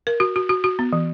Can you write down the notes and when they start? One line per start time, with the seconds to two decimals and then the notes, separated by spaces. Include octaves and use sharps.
0.07 A#4
0.20 F#4
0.36 F#4
0.49 F#4
0.64 F#4
0.79 B3
0.93 E3